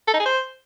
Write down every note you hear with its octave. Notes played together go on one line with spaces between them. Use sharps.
A4
D#4
G#4
C5